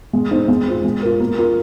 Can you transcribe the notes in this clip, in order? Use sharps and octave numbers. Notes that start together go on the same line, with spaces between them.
G#3
C4 D#4
G#3
C4 F4
G#3
F4 A#4
A#3
F4 A#4